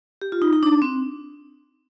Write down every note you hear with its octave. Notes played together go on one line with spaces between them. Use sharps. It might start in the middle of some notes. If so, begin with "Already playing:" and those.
G4
F4
D#4
D#4
D4
C4